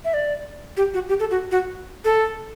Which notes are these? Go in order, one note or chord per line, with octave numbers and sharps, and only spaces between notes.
E5
D5
G4
F#4
G4
A4
F#4
F#4
A4